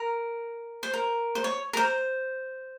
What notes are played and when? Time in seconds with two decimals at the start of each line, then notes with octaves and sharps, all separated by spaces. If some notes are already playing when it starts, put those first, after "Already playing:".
Already playing: A#4
0.83 C5
0.94 A#4
1.35 C5
1.44 C#5
1.73 A#4
1.77 C5